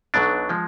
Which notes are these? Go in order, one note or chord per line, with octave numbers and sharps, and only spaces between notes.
B1 B2 F#3 D4
F3 G#3